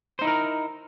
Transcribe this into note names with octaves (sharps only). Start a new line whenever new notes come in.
D#4 E4 A#4 C5